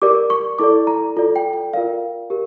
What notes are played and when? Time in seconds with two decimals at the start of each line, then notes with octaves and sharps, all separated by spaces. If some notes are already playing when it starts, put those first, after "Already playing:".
0.02 G4 A#4 D5 D6
0.30 C#6
0.59 E4 A4 D5 D6
0.87 A#5
1.17 F4 A4 D5
1.36 G5
1.53 G5
1.73 F4 A#4 D5 F5
2.30 G4 A#4